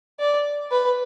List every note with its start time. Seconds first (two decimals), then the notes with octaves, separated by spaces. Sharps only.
0.20 D5
0.72 B4